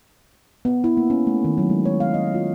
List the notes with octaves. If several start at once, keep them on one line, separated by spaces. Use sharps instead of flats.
B3
E4
A#3
C#4
A3
D#3
F#3
G#3
C#5
F5
D#5
F4